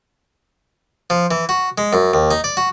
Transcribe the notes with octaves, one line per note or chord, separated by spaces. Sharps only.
F3
E3
F#4
G#3
F#2
D#2
D#4
D5
F#4